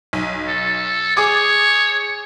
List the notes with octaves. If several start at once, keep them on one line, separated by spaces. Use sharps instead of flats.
B1
A4
G#4 C#5 D6 D#6